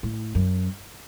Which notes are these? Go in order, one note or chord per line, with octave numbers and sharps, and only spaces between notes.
A2
F#2